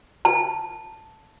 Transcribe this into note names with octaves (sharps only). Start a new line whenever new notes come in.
A5